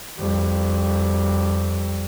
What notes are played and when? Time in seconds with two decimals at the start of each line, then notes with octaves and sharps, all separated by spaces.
0.19 F2 G3